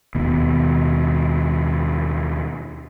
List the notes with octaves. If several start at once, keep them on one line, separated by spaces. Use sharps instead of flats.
D#2 B2